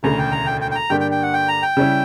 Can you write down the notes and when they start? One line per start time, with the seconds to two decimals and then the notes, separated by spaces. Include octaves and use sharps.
0.03 E1 D2 C#3 A#5
0.18 G5
0.31 A#5
0.46 G5
0.61 G5
0.71 G5
0.75 A#5
0.90 G2 D3 A#3 D4 G4 G5
1.00 G5
1.11 G5
1.23 F#5
1.33 G5
1.48 A#5
1.62 G5
1.77 C#3 G3 C#4 E4